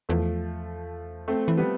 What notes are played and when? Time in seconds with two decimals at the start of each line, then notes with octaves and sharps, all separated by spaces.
0.09 E2 F3 A3
1.28 A3 C4
1.48 E3
1.57 G3 B3